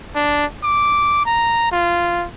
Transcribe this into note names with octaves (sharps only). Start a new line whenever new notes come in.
D4
D6
A#5
F4